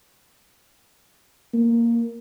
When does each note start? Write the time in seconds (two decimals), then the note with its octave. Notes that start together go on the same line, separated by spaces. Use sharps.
1.54 A#3